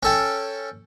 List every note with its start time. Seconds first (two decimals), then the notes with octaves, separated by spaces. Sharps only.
0.03 C#4 A4 G5